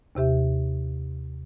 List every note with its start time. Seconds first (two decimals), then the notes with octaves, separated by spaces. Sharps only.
0.15 D#2 C3 G4 E5